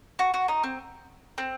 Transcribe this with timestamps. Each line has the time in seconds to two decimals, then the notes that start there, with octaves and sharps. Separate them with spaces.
0.19 F#4
0.34 F#4
0.48 D#4
0.64 C4
1.38 C4